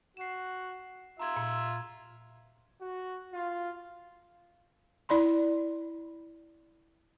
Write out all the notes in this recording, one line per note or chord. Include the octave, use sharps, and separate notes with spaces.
F#4 C7 E7
F4 E5 A#5 C6 G#6
A#2
F#4
F4
E4 D5 B5 C6